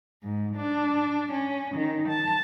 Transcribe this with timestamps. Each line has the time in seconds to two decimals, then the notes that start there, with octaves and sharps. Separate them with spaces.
0.22 G#2
0.55 D4
1.32 C#4
1.75 D#3
2.09 A5